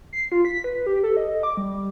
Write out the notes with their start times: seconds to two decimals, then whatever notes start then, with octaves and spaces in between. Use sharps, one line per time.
0.13 C7
0.32 F4
0.45 B6
0.64 B4
0.87 G4
1.03 A4
1.17 D#5
1.43 D6
1.57 G3